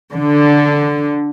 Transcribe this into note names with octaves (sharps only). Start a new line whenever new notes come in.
D3